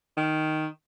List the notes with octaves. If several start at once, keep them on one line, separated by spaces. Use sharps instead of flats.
D#3